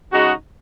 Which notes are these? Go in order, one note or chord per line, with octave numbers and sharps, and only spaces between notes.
C#3 G#3 D#4 F#4